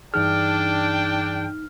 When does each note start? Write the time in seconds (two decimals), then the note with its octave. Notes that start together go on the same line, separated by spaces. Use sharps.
0.14 G2 E3 D4 D#4 G#4 G5 F6